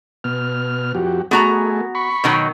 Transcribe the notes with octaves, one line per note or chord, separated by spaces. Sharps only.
B2 F6
F2 F#4 G4
A3 B3 F#4 G#4 A#5
B5 C#6
B2 D#3 F#3